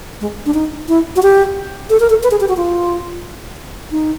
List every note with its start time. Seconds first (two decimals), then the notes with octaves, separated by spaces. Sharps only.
0.21 G#3
0.46 D4
0.54 D#4
0.88 E4
1.16 F#4
1.23 G4
1.90 A4
2.00 A#4
2.10 A4
2.23 B4
2.31 G#4
2.40 G4
2.48 F#4
2.57 F4
3.92 D#4